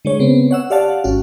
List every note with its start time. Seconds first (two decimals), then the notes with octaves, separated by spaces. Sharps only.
0.05 D3 G#3 C#5
0.19 C#3 B3 C4
0.51 C#5 F#5 E6
0.70 G4 C#5 D5 F5 F#5 A5
1.04 G#1 C#4 F#4